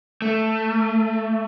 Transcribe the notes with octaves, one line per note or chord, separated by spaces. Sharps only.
A3